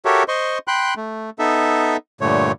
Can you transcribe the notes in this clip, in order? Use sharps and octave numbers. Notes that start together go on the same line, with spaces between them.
F#4 G4 A4 A#4 C#5 E5
C5 D#5 C6 C#6
G5 B5 C6 F#6
A3
B3 D#4 A4 E5
G2 A#2 D3 A3 C#5